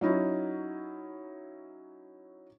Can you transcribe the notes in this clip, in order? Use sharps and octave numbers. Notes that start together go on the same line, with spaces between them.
F#3 C#4 D#4 E4